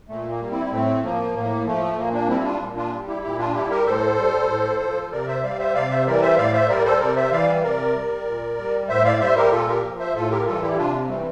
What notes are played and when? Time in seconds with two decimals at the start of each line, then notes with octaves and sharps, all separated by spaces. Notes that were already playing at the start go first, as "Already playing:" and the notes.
0.09 A#2 A3
0.30 A#3
0.40 G3
0.50 C4 E4
0.71 A2 A3 C4
1.03 F3 A#3
1.35 A2 A#3
1.65 F3 A3
1.97 A#2 A#3
2.13 A#3 D4
2.28 G3 C4 E4
2.44 D4 F4
2.61 A#2
2.76 D4 F4
2.92 G3
3.08 E4 G4
3.23 A#2 E4 G4
3.38 D4 F4
3.54 G3 E4 G4
3.70 G4 A#4
3.85 A2 A4 C5
4.18 G3
4.49 A2
4.80 F3
5.11 C3 A#4 D5
5.27 C5 E5
5.43 G3 D5 F5
5.58 C5 E5
5.74 C3 D5 F5
5.90 C5 E5
6.06 E3 G3 A#4 D5
6.21 C5 E5
6.37 A2 D5 F5
6.53 C5 E5
6.69 G3 A#4 D5
6.85 A4 C5
7.00 C3 A#4 D5
7.16 C5 E5
7.32 E3 G3 D5 F5
7.63 C3 A#4 D5
7.95 G3
8.26 A#2
8.58 G3
8.89 A2 C5 E5
9.05 D5 F5
9.20 G3 C5 E5
9.36 G4 A#4
9.52 A#2 F4 A4
9.68 G4 A#4
9.83 F3
9.99 C5 E5
10.15 A2 F4 A4
10.30 G4 A#4
10.46 E3 G3 F4 A4
10.62 E4 G4
10.77 C3 D4 F4
11.09 E3 G3 A3 C4